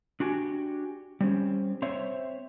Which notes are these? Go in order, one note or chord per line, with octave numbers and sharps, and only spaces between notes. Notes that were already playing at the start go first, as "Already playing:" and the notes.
D4 F#4 G4 G#5
G3 C4 C#4
C4 C5 C#5 E5